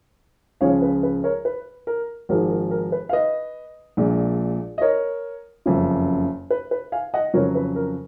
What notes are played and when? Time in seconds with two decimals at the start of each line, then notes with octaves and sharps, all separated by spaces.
0.61 C#2 C#3 F3 G#3 C#5 F5
0.82 B4
1.03 B4
1.24 A#4 C#5
1.45 B4
1.87 A#4
2.29 G#1 G#2 F3 G#3 A#4
2.50 A#4
2.71 A#4
2.92 B4
3.09 F5
3.13 B4 D#5
3.97 A#1 A#2 G#3
4.78 D#5
4.81 A#4 C#5
5.66 F#1 F2 C#3
6.50 B4
6.71 B4
6.92 F5 G#5
7.14 D#5 F#5
7.34 F2 C#3 F#3 A#4 C#5
7.55 B4
7.76 A#4